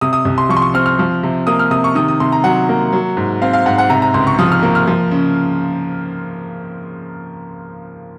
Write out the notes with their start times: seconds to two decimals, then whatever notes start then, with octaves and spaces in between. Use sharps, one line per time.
0.01 C3 D#6
0.13 D#6
0.25 C2
0.38 C6
0.49 F3 C#6
0.57 C6
0.62 C#6
0.74 C4 F6
0.86 F6
0.99 F3
1.23 C3
1.47 A#3 D#6
1.59 F6
1.71 C3 D#6
1.84 C#6
1.95 D#3 D#6
2.08 D#6
2.20 C3 C6
2.32 A#5
2.44 F#3 F#5
2.69 A#3
2.92 F#3
3.17 G#2
3.42 C4 F5
3.53 F5
3.66 G#2 F#5
3.78 F#5
3.90 C3 A#5
4.02 A#5
4.14 C#2 C6
4.27 C#6
4.39 F3 D#6
4.52 F6
4.63 A#3
4.75 F6
4.87 F3
5.11 C#3